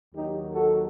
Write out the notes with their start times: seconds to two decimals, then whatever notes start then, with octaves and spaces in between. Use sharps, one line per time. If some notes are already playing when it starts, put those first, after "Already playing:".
0.14 D#2 D#3 F#3 D#4 G4
0.52 F#4 A4